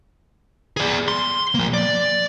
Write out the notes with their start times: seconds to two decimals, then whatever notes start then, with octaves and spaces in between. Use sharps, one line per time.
0.77 G#4 D5
1.08 C6
1.55 F3 A#3
1.74 D5